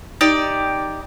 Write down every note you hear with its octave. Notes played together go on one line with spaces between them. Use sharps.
D#4 G4 D5